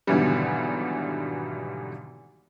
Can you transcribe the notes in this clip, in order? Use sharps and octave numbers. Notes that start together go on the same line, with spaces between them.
G#1 B2 D3 E3 F#3 G3